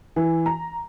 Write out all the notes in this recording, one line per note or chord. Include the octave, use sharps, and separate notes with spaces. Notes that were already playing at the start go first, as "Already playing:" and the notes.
E3
A#5